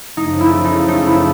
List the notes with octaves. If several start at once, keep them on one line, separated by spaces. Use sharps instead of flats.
F#2 C#3 F3 A3 D#4
E4
D#4
D#4
E4